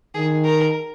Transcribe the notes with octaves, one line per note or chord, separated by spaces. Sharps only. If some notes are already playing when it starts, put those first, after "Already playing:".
D#3 G#4
A#4